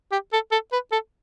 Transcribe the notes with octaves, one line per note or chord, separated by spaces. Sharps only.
G4
A4
A4
B4
A4